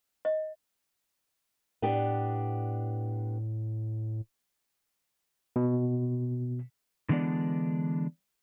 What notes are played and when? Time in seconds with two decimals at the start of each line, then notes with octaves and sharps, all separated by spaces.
0.25 D#5
1.82 A2 B3 D4 G4
5.56 B2
7.09 D3 E3 G#3 B3 D4 D5